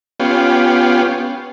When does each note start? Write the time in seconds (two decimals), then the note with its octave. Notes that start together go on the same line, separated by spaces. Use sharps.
0.20 B3 C#4 F4 G4